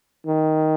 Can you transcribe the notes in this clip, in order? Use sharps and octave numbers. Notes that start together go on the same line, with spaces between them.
D#3